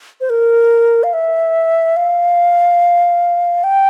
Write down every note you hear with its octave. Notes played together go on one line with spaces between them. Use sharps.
C5
A#4
F5
E5
F5
G5